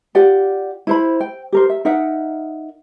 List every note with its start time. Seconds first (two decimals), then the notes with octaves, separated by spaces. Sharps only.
0.15 F4 G4 D5 F#5
0.87 E4 C5 B5
1.20 G5
1.52 G4 A#4 C5
1.69 E5
1.85 D#4 A#4 E5 F#5